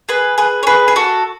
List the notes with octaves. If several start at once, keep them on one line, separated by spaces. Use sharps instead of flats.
G#4 B4
G#4 B4
C#5
G#4 B4
G#4
F#4 A4